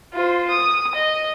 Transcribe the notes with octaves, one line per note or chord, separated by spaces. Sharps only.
F4 C5
D#6
D#5